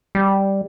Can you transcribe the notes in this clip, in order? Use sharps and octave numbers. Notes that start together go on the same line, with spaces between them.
G3